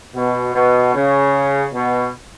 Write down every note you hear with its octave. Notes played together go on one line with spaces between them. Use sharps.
B2
B2
C#3
B2